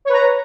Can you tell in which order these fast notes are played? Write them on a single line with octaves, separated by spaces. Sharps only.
C#5 B4 A#5